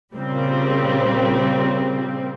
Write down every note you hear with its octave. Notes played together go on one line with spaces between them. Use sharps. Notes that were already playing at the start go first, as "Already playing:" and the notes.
A#2 C#3 G3 C4